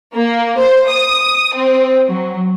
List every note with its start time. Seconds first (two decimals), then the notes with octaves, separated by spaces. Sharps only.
0.15 A#3
0.59 C5
0.90 D#6
1.55 C4
2.08 F#3